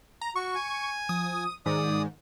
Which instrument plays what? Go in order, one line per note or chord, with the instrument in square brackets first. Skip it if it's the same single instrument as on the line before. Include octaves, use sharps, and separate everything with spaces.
[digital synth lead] A#5
[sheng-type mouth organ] F#4 [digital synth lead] C#6
[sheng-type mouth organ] G#5
[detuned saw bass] F3 [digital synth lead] D#6
[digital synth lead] G#2 [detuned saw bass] D#3 [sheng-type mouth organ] D5 D#6